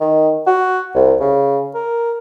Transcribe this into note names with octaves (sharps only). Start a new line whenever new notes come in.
D#3
F#4
C2
C#3
A#4